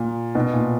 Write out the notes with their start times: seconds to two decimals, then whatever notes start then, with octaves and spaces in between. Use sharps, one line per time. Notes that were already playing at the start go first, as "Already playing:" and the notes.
Already playing: A#2
0.35 B2
0.53 A#2